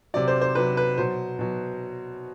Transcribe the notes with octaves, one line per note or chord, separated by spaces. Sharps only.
C3 F#3 D5
C5
C5
C3 F#3 B4
B4
B2 F#3 C5
B2 F#3